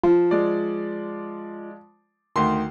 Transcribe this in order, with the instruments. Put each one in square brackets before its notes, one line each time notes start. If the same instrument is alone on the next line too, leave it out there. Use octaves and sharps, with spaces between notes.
[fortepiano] F3 [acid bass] F4
[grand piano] G#3 D5
[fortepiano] D2 D#3 [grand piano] C6